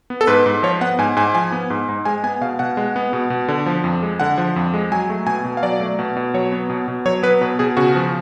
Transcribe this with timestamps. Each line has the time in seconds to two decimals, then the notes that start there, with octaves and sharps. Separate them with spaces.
0.10 B3
0.21 A4
0.27 G#2 B4
0.46 G#2
0.63 F3 C#5
0.81 B3 F#5
0.99 G#2 G#5
1.17 G#2 G#5
1.35 F3 G#5
1.52 B3
1.70 G#2
1.89 G#2
2.05 G#3 G#5
2.23 B3 G#5
2.41 B2 F5
2.59 B2 F#5
2.77 G#3
2.96 B3
3.13 B2
3.30 B2
3.48 D3
3.66 F3
3.84 F2
4.03 G#3
4.20 D3 F#5
4.38 F3
4.56 F2
4.74 G#3
4.92 F#3 G#5
5.09 A3
5.26 B2 G#5
5.44 B2
5.57 F5
5.63 F#3 D5
5.81 A3
5.99 B2
6.17 B2
6.34 F#3 C#5
6.52 B3
6.70 B2
6.88 B2
7.06 F#3 C#5
7.23 B3 B4
7.41 B2 B4
7.59 B2 G#4
7.77 C#3 F#4
7.95 F3